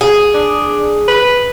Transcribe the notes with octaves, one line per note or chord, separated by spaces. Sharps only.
G#4
D4
B4